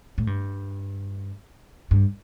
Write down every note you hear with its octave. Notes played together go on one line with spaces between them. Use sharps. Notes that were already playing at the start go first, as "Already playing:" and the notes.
A2
G2
G2